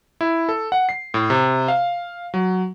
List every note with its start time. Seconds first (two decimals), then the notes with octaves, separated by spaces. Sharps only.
0.21 E4
0.49 A4
0.72 F#5
0.89 C7
1.14 A2
1.30 C3
1.68 F5
2.34 F#3